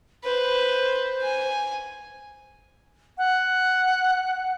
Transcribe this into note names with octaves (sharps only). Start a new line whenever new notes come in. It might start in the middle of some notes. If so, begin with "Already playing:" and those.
B4 C5
G#5
F#5